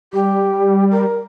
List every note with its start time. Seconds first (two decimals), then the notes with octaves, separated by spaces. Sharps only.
0.13 G3 G4
0.91 A#4